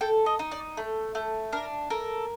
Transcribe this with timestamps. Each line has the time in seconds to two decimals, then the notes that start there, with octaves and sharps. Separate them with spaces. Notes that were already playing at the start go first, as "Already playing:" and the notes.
0.01 A4 G5
0.26 D#5
0.39 D#4
0.51 D5
0.77 A3
1.15 A3
1.52 D4 A#4
1.90 A4 A#4